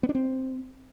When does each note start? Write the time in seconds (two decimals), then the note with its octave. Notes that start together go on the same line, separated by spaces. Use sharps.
0.03 B3
0.09 D4
0.15 C4